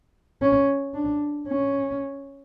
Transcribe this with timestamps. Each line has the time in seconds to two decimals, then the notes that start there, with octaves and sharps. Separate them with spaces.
0.42 C#4
0.94 D4
1.48 C#4